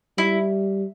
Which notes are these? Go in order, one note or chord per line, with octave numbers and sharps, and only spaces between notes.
G3 E4